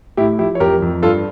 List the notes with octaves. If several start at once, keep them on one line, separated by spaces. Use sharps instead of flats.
A2 E4 G4
F3 E4 G4
C#5
F2 G4 A#4
F2
G2 F4 A4